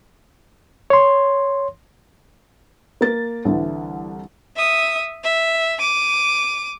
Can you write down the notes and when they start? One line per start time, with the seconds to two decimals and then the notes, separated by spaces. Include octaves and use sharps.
0.90 C#5 C6
3.01 A#3 A#4 A6
3.45 C2 D3 E3
4.56 E5 D#6
5.24 E5
5.80 D6 D#7